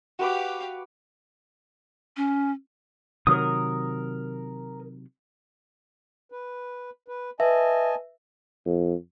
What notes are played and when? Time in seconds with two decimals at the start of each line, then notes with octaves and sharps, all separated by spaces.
0.19 F#4 G4 B4 F5 D6
2.16 C#4
3.27 C3 D#3 F#3 A#4 D#6
6.32 B4
7.08 B4
7.40 B4 D#5 E5 G#5 A5
8.65 F2